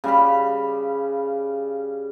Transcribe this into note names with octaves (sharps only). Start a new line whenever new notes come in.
C#3 G3 F5 B5